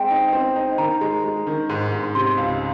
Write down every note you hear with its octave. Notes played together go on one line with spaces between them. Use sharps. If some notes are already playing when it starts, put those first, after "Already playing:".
Already playing: G#3 C4 G5
D#4
C4
D#4
D#3 A#5
G#3
G#3
D#3
G#2
G#2
C3 C6
C#2